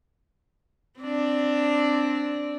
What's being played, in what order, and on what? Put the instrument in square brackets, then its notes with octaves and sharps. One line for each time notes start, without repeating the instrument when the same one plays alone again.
[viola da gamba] C4 D4